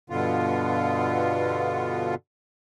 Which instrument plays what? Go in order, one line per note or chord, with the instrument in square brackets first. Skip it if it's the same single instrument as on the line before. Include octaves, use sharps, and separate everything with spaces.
[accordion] G2 B2 D3 B3 F4